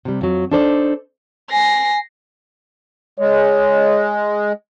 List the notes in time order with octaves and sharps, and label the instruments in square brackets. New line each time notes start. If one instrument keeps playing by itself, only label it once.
[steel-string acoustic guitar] C3 G3
F2 F#3
D4 D#4 A4 C5 D5
[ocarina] G#5 [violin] A#6 C7
[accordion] G#3 [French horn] C#5